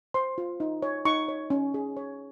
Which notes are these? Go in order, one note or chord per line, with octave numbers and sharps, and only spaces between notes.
C5 C6
F4
D#4
C#5
D#4 C#6
C#5
C#4
G#4
C#5